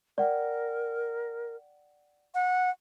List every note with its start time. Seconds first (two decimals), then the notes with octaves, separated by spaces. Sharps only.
0.18 A#4 D5 F#5 G5
2.35 F#5